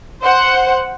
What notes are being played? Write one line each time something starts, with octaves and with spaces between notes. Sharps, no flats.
C5 F#5